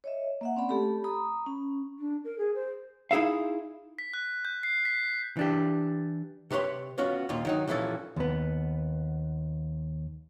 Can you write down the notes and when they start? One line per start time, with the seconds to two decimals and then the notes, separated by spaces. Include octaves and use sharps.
0.04 C#5 D#5 E5
0.41 A#3 E5 F#5
0.56 C4 C#4 D5 B5
0.69 A3 G4 A4 B5
1.04 A#5 B5 D#6
1.47 C#4
1.99 D4
2.24 A#4
2.38 G#4
2.55 C5
3.11 D#4 E4 G#4 E5 F5
3.99 B6
4.14 F#6
4.45 G6
4.63 C7
4.85 B6
5.37 E3 D4 G4
6.50 C3 G4 B4 C#5 C6
6.98 B3 C#4 F4 F#4
7.29 D#2 A#2 F4
7.45 D#3 F#3 D#4
7.68 C2 A#2 E3 F3 C#4 A4
8.16 D#2 B3